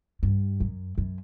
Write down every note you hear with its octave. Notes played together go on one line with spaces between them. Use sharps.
G2
F#2
F#2